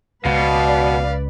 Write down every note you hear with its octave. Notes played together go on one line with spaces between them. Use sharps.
C#2 B2 B4 D5 F5